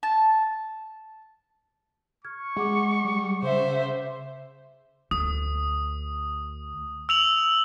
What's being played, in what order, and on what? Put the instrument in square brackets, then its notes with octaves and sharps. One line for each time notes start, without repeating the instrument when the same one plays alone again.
[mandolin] A5
[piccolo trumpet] C#6 [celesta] F6 G#6
[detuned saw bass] G#3 [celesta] G#4 F#5 D6
[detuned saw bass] G3
[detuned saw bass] C#3 [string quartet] C5 E5
[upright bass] D2 [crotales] D#6
[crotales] E6 F7 F#7